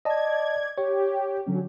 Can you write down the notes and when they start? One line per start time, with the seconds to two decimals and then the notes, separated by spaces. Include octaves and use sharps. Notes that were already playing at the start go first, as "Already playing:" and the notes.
0.05 D5 D#5 A5 G#6
0.78 G4 C#5
1.46 D3 F#3 C#4